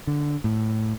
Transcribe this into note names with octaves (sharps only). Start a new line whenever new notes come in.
D3
A2